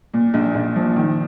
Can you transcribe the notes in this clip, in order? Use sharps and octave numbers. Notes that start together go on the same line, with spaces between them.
A#2
A#1
A#1
F3
D#3